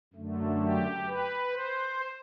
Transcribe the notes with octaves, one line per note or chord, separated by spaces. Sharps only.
F#2 D3 A3
G4
B4
C5